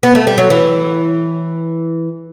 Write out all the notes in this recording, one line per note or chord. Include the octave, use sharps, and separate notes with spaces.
B3
A3
G3
F#3
E3